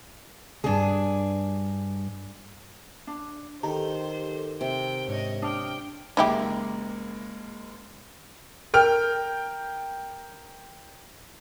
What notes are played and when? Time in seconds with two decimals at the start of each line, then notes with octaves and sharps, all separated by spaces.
0.64 C#2 G2 D4 G#4
3.07 D4
3.63 D#3 G4 A4 C5 A#5
4.61 C3 G5
5.08 G#2 D4 C#5 D#5
5.42 D4 G5 D#6 F6
6.17 F#1 G#3 A#3 D#4 E4 G4
8.74 A#4 G5 F6